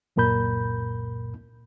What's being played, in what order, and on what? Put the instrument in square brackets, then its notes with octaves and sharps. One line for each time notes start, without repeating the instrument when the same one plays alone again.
[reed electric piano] C#2 F#2 A#2 A#4 B5 G6